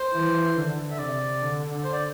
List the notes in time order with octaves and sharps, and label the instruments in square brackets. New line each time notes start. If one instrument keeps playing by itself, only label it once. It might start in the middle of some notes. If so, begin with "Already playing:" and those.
Already playing: [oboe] C5
[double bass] E3
D3
[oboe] E5
[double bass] C3 [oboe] D5
[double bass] D3
[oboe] C5
D5